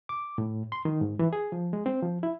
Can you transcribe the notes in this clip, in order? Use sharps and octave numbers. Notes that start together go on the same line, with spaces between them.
D6
A2
C6
D#3
G#2
E3
G#4
F3
G#3
C4
F3
E4